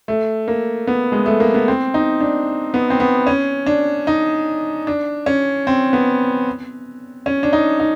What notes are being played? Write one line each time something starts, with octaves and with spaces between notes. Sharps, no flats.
A3
A#3
B3
G#3
A3
A#3
B3
C4
D#4
D4
B3
C4
B3
C#4
D4
D#4
D4
C#4
C4
B3
C#4
D4
D#4
D#4